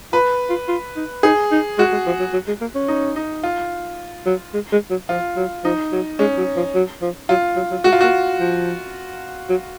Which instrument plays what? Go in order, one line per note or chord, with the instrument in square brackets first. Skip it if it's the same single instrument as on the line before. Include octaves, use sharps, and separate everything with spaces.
[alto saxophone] F4 [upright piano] B4
[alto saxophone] F4
F4
D#4
[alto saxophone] D#4 [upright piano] G#4
[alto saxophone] D#4
[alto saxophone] G#3 [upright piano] F#4
[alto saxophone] G#3
F3
F#3
F#3
G#3
A#3
C#4
[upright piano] D#4
D#4
F4
[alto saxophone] F#3
G#3
G#3
F#3
[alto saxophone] F3 [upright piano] F4
[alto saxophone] F#3
[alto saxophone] F3 [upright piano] D#4
[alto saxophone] F#3
[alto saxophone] G#3 [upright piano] C#4
[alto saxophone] F#3
F3
F#3
F3
[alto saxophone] F#3 [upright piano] F4
[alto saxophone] F#3
F#3
[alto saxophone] G#3 [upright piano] F#4
[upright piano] F4
[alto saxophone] A#3 [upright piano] F#4
[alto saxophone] F3
F#3